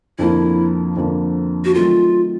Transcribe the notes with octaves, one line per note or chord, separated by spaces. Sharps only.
F2 D3 F3 A#3 E4
F2 D3 F3 A#3
F#4
D#3 F#3 A3 C4 F4